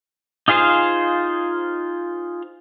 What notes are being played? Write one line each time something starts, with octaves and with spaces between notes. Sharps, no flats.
D#4 F4 G#4 C5 F5